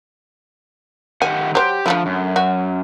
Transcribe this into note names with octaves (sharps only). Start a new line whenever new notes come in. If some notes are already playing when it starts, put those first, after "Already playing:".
D#3 G4 F#5 G#5
F#3 G4 C5
D3 F3 A3 E4
F#2
F#4